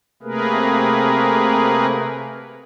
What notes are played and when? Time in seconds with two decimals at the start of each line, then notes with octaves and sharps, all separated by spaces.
0.23 C3 A3 A#3 G#4 A#4 B4